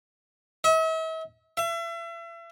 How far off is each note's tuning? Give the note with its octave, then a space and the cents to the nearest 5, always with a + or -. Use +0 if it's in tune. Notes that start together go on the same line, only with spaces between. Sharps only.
E5 -45
E5 +35